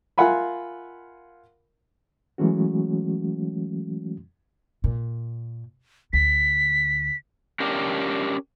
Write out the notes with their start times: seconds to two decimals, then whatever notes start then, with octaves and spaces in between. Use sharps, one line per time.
0.18 F4 A#4 E5 F#5 G#5 B5
2.38 E3 F#3 G#3 A3 C#4 F#4
4.84 A#2
6.13 D2 B6
7.60 C#4 D4 G4 A#4